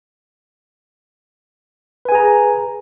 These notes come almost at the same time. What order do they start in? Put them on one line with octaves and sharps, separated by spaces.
B4 G#5 G#4 A#5